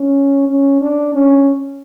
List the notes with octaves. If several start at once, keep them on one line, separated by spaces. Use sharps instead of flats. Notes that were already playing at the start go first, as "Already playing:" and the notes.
Already playing: C#4
C#4
D4
C#4